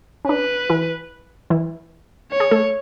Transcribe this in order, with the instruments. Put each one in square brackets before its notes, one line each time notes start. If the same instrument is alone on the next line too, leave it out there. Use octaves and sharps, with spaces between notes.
[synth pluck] C#4
[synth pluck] D4 [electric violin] B4
[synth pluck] E3 E4
E3 E4
[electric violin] C#5
[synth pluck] G#4
A3 A4